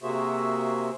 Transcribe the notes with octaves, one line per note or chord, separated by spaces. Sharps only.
C3 A#3 F#4 G#4 C5 E5